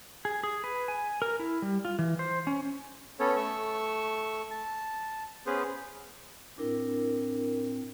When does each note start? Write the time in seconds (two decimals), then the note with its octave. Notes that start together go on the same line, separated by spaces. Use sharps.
0.25 G#4
0.43 G#4
0.64 B4
0.88 G#5
1.22 A#4
1.39 E4
1.62 G3
1.85 F4
1.99 E3
2.19 C5
2.47 C#4
3.19 B3 C#4 A4 C#5
3.36 A3 C#6 E6
4.51 A5
5.46 B3 C#4 G#4 B4 C5
6.58 A2 C4 D4 E4 A#4